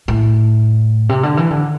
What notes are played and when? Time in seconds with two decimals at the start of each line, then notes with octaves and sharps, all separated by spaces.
0.08 A2
1.09 C3
1.23 D3
1.37 E3
1.50 D3